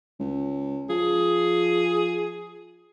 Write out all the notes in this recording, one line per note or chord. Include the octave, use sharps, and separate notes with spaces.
C#2
F3 G#4